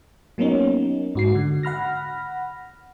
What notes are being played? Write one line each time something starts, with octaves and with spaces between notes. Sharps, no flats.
F#3 A#3 B3 C#4 D#4
G#2 F#4 C7
D3
F#5 B5 F6 A#6